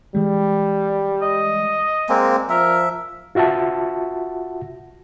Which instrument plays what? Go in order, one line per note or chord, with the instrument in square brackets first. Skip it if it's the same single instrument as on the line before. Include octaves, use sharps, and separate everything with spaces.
[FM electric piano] E3 G#3 [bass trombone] G3
[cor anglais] D#5
[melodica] G#3 A#3 C4 [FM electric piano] D5 G#5
[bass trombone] F3 [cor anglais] A#4 [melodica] E5
[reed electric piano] F4 F#4 E5 F#5 A5